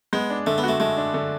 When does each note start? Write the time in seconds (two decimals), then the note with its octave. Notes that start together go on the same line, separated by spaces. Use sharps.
0.13 G#3 B3
0.30 D4
0.47 D3 A3
0.58 B3
0.64 A3 F#4
0.80 G#3 A3
0.97 D4
1.14 D3